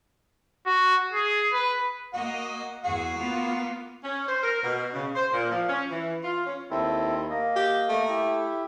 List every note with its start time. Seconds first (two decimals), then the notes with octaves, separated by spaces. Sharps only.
0.66 F#4
1.13 G#4
1.53 B4
2.14 A#3 F#4 D#5
2.84 E2 F#4 G#4
3.17 A#3 B3 F4
4.03 C#4
4.28 C5
4.43 A#4
4.63 B2
4.92 C#3
5.15 C5
5.32 A#2
5.51 F3
5.69 C#4
5.90 E3
6.23 F4
6.46 C#4
6.71 D#2 C4 E4 A4
7.30 A#3 D#5
7.56 G4
7.89 A3
8.09 E4 G4